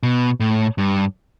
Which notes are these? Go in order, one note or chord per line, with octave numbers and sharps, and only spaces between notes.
B2
A2
G2